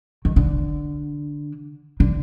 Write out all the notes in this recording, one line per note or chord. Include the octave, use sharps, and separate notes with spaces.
D#3
D3
D3